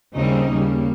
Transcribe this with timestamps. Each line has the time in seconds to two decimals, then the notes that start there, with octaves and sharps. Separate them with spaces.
0.16 D#2 C#3 G3 C4 D#4
0.50 D#2 C#3 G3 A#3